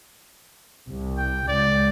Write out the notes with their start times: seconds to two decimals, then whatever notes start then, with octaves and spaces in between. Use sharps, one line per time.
0.88 C2
1.18 G5
1.48 C#2 D5